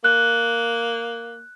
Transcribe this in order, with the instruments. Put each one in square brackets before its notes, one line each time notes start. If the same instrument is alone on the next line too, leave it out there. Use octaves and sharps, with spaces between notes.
[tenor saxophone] A#3 [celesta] F#6